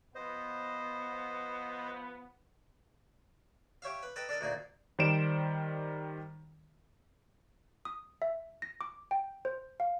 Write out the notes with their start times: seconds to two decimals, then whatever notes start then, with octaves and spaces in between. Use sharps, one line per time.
0.15 F3 B3 C5 D#5
3.82 G4 C#5 E5 F5
4.03 B4
4.16 A4 B4 D#5 G5 A#5
4.29 D4 A4 A#4 D#5
4.41 D2 A#2 D#4 G#4
4.99 D#3 G3 C5 D5 D7 E7
7.85 D#6
8.22 E5
8.62 A#6
8.81 D6
9.11 G5
9.45 C5
9.80 F5